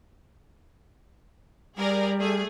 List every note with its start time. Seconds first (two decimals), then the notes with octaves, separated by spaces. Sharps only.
1.77 G3 G#4 A#4 D5
2.19 A3 G#4